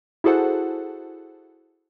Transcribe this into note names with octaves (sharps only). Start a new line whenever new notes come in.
E4 F#4 G#4 A4 C5 F#5